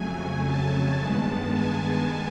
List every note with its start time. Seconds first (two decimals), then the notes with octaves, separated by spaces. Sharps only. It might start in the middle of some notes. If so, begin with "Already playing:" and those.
Already playing: F2 C#3 F#3 A3 G#5
0.45 A5
0.99 G2 D#3 G#3 B3 A5
1.53 G#5